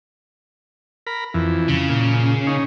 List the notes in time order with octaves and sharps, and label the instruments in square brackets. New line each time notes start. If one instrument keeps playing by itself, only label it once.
[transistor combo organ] A#4 B5
F2 E3
[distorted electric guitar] C#3
[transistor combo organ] A#2
D#4 C#5